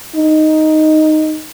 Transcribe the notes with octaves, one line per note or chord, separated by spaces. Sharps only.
D#4